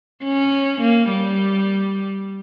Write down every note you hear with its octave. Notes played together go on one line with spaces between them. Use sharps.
C#4
A#3
G3